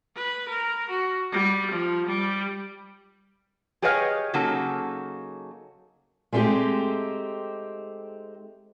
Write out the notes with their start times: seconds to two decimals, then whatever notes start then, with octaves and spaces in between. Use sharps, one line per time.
0.16 B4
0.49 A#4
0.90 F#4
1.32 G3
1.72 F3
2.06 G3
3.82 G4 G#4 B4 C#5 D#5 F5
4.34 C#3 F#3 A#3 D#4 A4
6.33 G#3 A3 C4 C#4 D#4 G4